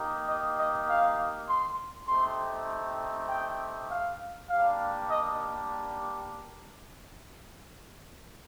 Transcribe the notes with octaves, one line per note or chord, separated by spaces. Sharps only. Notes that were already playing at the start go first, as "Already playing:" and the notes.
Already playing: A#3 D#4 G4
D#5
D#5
F5
C6
A3 C4 D#4 G4 C6
G5
F5
G3 A#3 D4 G4 F5
D#5